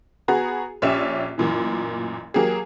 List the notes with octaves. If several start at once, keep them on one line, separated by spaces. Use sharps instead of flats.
B3 F#4 G#4 G#5 A#5
A#1 C#4 G4 D5 E5 E7
A1 F#2 A#2 E3
F#3 A#3 G4 G#4